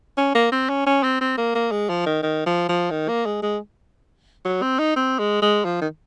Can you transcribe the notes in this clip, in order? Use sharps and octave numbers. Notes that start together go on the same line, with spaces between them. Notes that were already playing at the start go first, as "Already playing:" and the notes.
C#4
A#3
C4
C#4
C#4
C4
C4
A#3
A#3
G#3
F3
D#3
D#3
F3
F3
D#3
A#3
G#3
G#3
F#3
C4
D#4
C4
G#3
G#3
F3
D#3